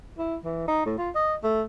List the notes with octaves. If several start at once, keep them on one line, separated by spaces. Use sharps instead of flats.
E4
E3
D#4
A2
F4
D#5
A3